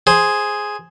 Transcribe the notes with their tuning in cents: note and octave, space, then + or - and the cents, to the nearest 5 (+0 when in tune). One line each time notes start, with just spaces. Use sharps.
G#4 +0 C5 +0